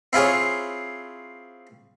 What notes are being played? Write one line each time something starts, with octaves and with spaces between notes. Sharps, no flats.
C4 E4 F4 G#4 C#5